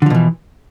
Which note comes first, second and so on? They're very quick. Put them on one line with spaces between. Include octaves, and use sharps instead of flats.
D3 F3 B2 E3